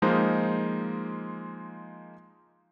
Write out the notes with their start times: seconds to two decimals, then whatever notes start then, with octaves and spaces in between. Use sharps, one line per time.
0.02 F3 G#3 A#3 D#4 F4 C5